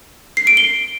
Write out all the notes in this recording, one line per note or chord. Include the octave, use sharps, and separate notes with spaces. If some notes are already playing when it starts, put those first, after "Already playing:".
C7
D7
G7